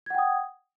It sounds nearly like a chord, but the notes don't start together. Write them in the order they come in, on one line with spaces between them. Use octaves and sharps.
G#6 F#5 G5 D#6